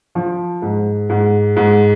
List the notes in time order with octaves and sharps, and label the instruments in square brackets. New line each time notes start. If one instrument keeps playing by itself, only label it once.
[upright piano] F3
G#2
G#2
G#2